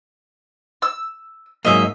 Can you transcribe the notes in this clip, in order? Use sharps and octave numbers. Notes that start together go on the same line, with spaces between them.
E6
G#2 F#3 A#3 D#5 E5